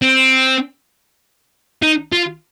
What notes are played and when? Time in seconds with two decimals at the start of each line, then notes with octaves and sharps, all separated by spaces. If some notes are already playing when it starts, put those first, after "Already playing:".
0.02 C4
1.82 D#4
2.12 F4